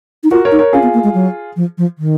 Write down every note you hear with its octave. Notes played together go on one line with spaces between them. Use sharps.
D#4
F4 F#4 A#4
A#4 C#5
D#4
A#4 C#5
C#4 F4 G#4
B3
A#3
G#3
F#3
F3
F3
D#3